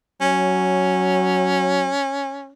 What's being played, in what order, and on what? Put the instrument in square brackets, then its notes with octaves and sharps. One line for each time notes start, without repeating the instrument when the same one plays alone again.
[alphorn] F#3 [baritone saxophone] C#4